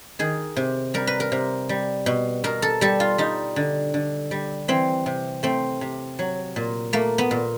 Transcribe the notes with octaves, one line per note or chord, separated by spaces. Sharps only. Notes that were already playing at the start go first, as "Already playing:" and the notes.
D#3 G#4
C3
G3 A#4
B4
A#4
C3
G3
B2
B2 A#4
A4
G3 A4
F4
G3 D#4
D3
D3
G3
E3 C4
C3
A3 C4
C3
F#3
A#2
A3 A#3
B3
A#2